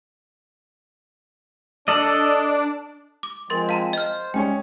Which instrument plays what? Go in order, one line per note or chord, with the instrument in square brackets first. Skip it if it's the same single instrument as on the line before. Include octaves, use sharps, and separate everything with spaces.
[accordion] D4 [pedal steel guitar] A4 D5 D#5
[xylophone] D6
[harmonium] F3 G#3 C4 [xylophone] A#4 C6 A6
[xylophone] F5 A5 A#5
[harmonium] C5 [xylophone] D#5 F6
[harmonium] G3 [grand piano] G#3 C#4 C#5 [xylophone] G5